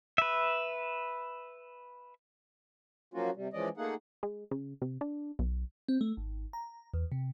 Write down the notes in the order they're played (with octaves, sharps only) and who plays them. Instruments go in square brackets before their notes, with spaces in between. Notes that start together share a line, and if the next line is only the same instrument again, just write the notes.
[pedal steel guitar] B4 E5
[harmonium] F3 F#3 A#3 C#4 F4 F#4
C3 G3
E3 F3 G#3 C#4 D5 D#5
A3 A#3 D#4 F4 G#4 F#5
[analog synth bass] G#3
C#3
C3
D4
B1
[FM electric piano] C4
A3
G#1
A#5
E2
C3